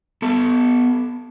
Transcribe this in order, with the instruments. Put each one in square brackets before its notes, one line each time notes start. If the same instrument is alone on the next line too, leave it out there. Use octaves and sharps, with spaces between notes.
[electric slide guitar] B3 A4